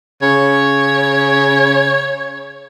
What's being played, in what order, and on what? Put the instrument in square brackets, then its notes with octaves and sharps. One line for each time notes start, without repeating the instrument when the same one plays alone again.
[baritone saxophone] C#3 [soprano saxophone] C#5